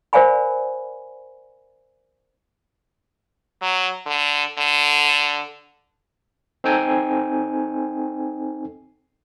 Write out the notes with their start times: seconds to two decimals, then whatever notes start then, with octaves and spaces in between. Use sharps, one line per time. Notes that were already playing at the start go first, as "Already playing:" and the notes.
0.13 A#4 C5 D5 F5 G#5 B5
3.62 F#3
4.07 D3
4.58 D3
6.64 C4 D#4 A4 G5 G#5